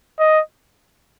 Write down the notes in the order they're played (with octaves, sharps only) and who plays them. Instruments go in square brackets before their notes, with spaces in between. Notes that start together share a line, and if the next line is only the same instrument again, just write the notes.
[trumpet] D#5